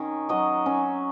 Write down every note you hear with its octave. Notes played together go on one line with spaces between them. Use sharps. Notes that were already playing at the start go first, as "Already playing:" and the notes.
Already playing: D#3 C#4 G#5
F#3 D#5
C#4